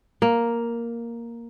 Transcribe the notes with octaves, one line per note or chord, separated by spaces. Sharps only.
A#3